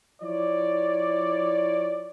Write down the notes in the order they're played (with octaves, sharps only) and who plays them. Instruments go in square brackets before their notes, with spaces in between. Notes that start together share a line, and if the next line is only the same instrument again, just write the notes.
[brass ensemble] F3 E4 C#5 D5